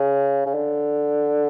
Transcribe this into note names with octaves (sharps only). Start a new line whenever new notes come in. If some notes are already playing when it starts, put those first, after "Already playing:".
Already playing: C#3
C#3
D3